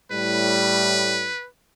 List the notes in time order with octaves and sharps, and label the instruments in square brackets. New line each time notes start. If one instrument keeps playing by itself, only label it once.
[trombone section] A2 G3 [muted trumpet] B4